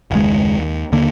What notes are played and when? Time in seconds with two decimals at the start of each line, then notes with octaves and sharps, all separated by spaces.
0.11 F#1 D#2 G#3
0.58 D#2
0.92 D#2 D3 A#3